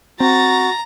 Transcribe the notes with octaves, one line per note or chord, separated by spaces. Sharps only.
C4 F#4 A#5 A6 A#6